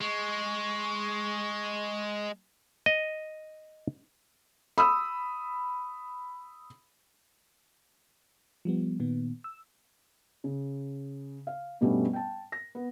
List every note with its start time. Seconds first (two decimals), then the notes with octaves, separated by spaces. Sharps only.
0.01 G#3 C#6
2.86 D#5
4.78 B5 D#6 E6
8.65 F3 G3 B3
9.00 A#2 D#3 B3
9.44 E6
10.44 C#3
11.47 F5
11.81 G2 B2 G3 A3 B3 C#4
12.13 G5 A5
12.52 A#6
12.75 B3